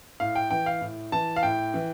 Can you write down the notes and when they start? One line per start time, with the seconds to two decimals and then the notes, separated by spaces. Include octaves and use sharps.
0.20 A2 F5
0.36 G5
0.51 E3 G5
0.66 F5
0.81 A2
1.12 E3 A5
1.36 F5
1.43 A2 G5
1.74 E3